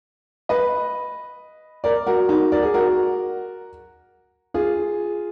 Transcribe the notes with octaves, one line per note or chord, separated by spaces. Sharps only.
B4 D#5
A#4 D5
F#4 A#4
D#4 F#4
A#4 D5
G#4
F#4 A#4
F4 G#4